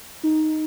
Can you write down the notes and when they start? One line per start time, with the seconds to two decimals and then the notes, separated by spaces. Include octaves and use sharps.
0.23 D#4